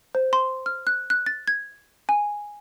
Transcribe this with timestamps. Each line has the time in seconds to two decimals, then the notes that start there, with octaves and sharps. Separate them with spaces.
0.15 C5
0.33 C6
0.66 F6
0.87 F#6
1.10 F#6
1.26 A6
1.48 G#6
2.09 G#5